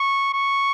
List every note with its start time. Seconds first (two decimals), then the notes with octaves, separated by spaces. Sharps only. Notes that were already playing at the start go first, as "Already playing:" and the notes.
Already playing: C#6
0.34 C#6